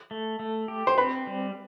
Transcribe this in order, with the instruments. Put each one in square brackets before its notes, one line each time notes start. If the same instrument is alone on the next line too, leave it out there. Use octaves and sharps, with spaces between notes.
[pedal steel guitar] A3
A3
G4
[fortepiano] C5
[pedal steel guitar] C4 [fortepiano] B4
[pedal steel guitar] G3